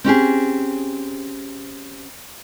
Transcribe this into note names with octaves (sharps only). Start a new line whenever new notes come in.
C4 C#4 G4 G#4